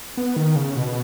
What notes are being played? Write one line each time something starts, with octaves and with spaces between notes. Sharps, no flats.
B3
D#3
C#3
B2